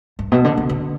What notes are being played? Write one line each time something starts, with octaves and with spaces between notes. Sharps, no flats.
G2
B2
D3
D3
D3